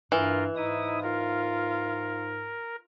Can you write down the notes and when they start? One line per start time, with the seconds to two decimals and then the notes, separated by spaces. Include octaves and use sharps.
0.12 G2 E3 F4 A#4
0.56 G#2 D#4 E4 D#6
1.02 F4 A#4